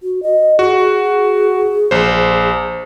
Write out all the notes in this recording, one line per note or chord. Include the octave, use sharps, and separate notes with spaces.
F#4
D#5
F#4 G#4
G#4
A#1 C5